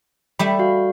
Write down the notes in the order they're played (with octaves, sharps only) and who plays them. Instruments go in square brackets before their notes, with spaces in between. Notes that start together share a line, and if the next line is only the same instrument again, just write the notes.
[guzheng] G3 A3 E5 [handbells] B5
[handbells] F#4 F5